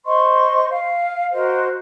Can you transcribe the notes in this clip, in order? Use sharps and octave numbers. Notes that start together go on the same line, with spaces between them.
C5 D#5 C6 C#6
F5
F#4 A#4 C5 D#5